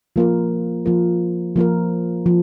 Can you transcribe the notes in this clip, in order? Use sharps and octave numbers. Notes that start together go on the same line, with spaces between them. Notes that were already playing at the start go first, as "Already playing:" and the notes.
F3 A#3 F4 A#4
F3 A#3 F4 A#4
F3 A#3 F4 A#4
F3